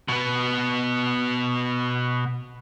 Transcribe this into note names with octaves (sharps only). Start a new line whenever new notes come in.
B2 B3